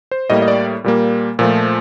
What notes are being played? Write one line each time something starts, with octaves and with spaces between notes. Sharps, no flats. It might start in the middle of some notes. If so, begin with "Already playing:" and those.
C5
A2 G3 A#3 D#5
D#5
D5
A#2 G3 A#3
A#2 F3 A3